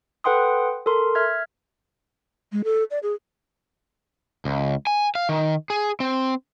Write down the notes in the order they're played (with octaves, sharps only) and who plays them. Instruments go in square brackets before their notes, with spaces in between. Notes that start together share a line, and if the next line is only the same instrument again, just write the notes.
[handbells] A4 B4 F#5 G5 C6 D#6
A4 A#4 C6
E5 F6 G#6
[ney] G#3
A4
D5
G#4
[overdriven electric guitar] C#2
G#5
F5
D#3
G#4
C4